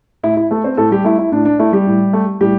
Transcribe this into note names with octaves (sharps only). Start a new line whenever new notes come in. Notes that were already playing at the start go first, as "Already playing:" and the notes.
A2 E4
E4
A3 A4
C4 C5
A2 A3 A4
G3 G4
A3 E4
E4
A2 D4
D4
A3 E4
G3 G4
A2
A3
A2 G3 G4